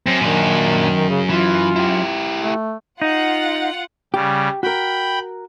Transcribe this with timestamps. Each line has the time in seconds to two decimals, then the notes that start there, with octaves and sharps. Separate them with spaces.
0.06 F#2 C4
0.21 A#2 D#3 D4
1.09 C#3
1.30 E3 F4
1.76 E4 G4
2.40 A3
3.02 D#4 F4 F#5
4.14 C#3 G3 G4
4.63 F#4 A#4 G5 B5